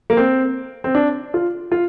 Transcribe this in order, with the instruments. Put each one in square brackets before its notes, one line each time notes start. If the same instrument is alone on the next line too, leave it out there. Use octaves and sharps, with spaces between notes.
[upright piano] A#3
C4
C4
D4
F4
F4